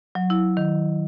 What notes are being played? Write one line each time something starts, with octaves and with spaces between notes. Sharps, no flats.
F#3
E4
D#3